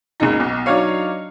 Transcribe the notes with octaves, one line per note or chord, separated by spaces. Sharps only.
F#1 C#2 D#4
B1
F#3 D4 D#4 F#4 C#5 F5